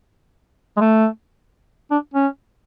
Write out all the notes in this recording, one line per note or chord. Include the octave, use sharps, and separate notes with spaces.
G#3
A3
D4
C#4